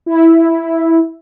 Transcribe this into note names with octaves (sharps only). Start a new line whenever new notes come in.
E4